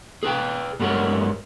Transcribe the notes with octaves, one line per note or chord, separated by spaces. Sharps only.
G#4 B4 G5
G2 G3 G#3 F#4 A#4 C#5